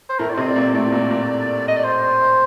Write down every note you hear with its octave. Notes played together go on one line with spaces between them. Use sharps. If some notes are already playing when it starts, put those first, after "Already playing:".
C5
A2 A3 A#4
D5
C3 C4 C5
D#5
D5
A#2 A#3
D5
A2 A3 D5
A#2 A#3
A#2 A#3
D#5
D5
C5